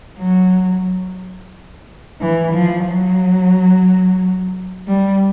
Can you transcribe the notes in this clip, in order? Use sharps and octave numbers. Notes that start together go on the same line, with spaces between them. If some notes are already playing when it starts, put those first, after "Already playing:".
F#3
E3
F3
F#3
G3